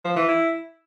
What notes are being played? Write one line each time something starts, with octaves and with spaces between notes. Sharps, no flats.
F3
E3
E4